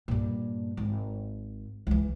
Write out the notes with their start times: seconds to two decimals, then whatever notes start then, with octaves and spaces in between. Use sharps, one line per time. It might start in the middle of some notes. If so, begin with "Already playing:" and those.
0.08 G2 A#2
0.77 G#1
1.87 C#2 E3